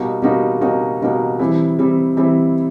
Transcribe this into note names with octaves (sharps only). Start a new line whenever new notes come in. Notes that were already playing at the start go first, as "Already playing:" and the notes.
Already playing: B2 G3 A#3 D#4 F#4
B2 G3 A#3 D#4 F#4
B2 G3 A#3 D#4 F#4
B2 G3 A#3 D#4 F#4
E3 G3 C4 E4
E3 G3 C4 E4
E3 G3 C4 E4